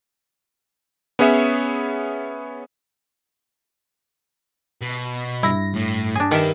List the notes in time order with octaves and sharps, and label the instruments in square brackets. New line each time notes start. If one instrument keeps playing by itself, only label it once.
[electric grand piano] B3 C#4 G#4 C#5 E5
[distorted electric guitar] B2
[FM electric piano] G2 A#6 [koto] E4
[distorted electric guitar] A2
[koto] D4 G#4
[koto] D#3 A#4 E5 [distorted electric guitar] G4 B4